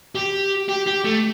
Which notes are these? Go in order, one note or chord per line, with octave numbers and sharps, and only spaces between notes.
G4
G4
G4
A3